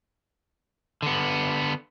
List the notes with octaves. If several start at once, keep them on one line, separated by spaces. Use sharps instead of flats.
D3 B3